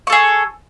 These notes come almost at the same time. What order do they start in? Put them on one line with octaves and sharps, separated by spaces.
C#6 A4 G#4